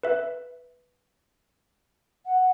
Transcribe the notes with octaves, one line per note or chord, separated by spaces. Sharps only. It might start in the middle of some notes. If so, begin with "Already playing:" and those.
B4 E5
F#5